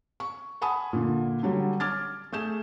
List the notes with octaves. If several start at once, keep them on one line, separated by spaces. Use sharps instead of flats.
C#6
F#5 G#5 A5 B5 D#6
A#2 D3
D3 F#3 G3
D6 F6 G#6 A6
A3 G#4 G6 E7